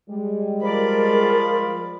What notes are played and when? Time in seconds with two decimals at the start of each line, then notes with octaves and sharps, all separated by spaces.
0.10 G3 G#3
0.61 F3 A#4 D5 B5